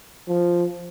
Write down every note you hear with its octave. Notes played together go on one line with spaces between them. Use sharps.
F3